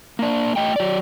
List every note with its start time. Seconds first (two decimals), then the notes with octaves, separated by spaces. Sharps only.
0.19 A#3 D4
0.56 A3 D#5 G5
0.76 F#3 D5